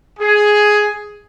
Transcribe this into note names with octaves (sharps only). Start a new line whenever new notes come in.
G#4